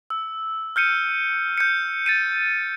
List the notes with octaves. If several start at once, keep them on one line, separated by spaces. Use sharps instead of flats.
E6
F6 G6 C#7 D#7
G6 C#7
A6 C#7 D#7